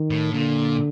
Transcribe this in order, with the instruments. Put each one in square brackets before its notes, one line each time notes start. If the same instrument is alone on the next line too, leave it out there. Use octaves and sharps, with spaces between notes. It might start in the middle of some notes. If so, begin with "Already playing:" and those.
Already playing: [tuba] D#3
[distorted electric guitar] A2
[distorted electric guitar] A#2 [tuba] D3